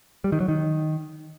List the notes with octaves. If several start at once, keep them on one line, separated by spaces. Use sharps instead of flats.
G3
D#3
F#3
D#3